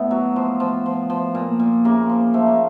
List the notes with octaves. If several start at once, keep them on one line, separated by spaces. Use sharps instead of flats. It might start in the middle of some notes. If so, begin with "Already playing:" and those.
Already playing: A2 B3
F#3
F3
F3
F3
F3
A#2
A#2
C#3 A#3
F3
F3 A3
A#3